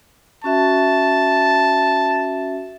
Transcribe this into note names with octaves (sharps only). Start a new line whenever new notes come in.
C#4 F#4 E5 A5